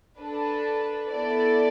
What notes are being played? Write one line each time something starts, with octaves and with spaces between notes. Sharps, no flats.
D4 A4 B4
B3 E4 A4 D5